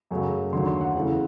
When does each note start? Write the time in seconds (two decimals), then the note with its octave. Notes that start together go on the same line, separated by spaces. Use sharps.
0.11 F#2 C#3 F#3 A3
0.52 D#2 D3 F#3 A3 C6
0.67 C6
0.81 F#5
0.95 E2 C#3 E3 A3